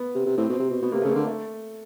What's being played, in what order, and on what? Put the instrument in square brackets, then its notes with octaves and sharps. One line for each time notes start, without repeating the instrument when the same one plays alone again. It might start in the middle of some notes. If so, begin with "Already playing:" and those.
Already playing: [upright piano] B3
[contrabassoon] C3
C3
[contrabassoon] A2 [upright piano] C4
[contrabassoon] B2 [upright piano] C4
[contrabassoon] C3
B2
[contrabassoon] B2 [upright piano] B3
[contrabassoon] C3 [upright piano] A#3
[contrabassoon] C#3 [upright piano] A3
[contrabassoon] D3 [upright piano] A#3
[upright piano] A3